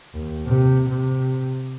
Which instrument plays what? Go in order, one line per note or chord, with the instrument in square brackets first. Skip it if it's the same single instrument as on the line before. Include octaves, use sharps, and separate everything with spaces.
[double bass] D#2
C3
C3